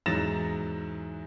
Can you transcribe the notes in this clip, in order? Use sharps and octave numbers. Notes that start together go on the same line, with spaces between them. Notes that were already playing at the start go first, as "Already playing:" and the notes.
E2 G#2 F#3 A6 A#6 E7